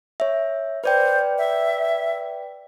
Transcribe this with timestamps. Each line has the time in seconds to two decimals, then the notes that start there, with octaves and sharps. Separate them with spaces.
0.20 C#5 E5
0.84 B4 C5 D5 G5
1.38 E5